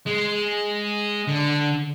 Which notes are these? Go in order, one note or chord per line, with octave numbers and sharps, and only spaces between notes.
G#3
D3